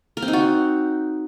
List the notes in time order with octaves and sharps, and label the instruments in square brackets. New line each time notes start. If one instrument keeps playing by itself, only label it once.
[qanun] A#4
C4
D#4
F#4